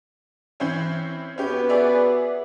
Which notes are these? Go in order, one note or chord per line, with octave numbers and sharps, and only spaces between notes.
E3 C4 C#4
B3 C#4 F#4 G4 B4
G#4 D5 E5